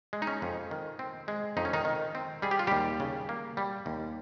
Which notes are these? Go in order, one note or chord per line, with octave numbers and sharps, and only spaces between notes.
G#3
D#4
C#4
F2
D#3
C4
G#3
F2 D#4
C#4
D#3 D#4
D#3
C4
G3 G#4
G4
F4
D#2 G3 G4
C#3
A#3
G3
D#2